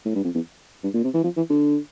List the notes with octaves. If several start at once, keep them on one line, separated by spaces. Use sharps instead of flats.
A2
G2
F2
E2
G2
A#2
C3
E3
F3
E3
D3